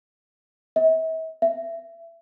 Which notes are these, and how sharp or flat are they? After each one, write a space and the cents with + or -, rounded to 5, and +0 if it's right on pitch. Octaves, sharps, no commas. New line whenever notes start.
E5 -40
E5 +25